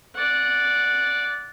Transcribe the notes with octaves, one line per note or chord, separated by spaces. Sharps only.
D5 F#5